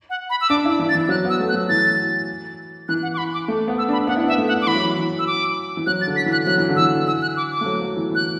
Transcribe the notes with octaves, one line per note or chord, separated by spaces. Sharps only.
F#5
B5
E6
D4 D6
E4 E6
E3
A6
E3
F#3 F#6
B3 E6
A3
F#6
F#3
E3 A6
E3 F#6
F#5
D6
B5
D6
A3
B3
E6
D4 B5
B3 F#5
E4
D4
E5
B3
A3
F#5
D6
E3 B5
F#3
E3
E3
E6
D6
E3
F#3 F#6
A6
D3
B6
E3
F#6
F#3 F#6
E3
D3
E3 E6
E6
F#6
D6
D6
A3
F#3
F#3
E3
E3 F#6